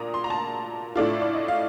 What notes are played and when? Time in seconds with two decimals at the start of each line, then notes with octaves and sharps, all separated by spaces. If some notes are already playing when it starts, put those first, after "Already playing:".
Already playing: A#2 D4 A#5 D#6
0.14 C6
0.24 A#5
0.30 A5
0.96 A2 A3 D4 F4
1.22 D5
1.35 D#5
1.48 F5